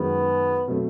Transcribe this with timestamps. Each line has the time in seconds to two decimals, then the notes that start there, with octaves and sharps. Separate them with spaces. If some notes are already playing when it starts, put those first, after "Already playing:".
Already playing: F#2 D#3 G#3 B3
0.67 B2 F#3 A3 C4